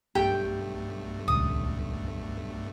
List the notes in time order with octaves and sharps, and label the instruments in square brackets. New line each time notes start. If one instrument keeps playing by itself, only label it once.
[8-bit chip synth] B1 G2 A3 [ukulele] G4 [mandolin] G5
[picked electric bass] D#1 C#2 [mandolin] D#6